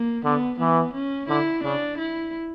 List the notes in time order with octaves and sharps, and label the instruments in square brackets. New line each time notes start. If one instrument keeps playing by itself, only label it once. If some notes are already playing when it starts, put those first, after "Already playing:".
Already playing: [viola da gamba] A#3
[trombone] D3 [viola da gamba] B3
[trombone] E3 [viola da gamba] B3
[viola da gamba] C#4
[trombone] D3 [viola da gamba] E4
[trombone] C#3 [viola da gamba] D4
[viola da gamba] E4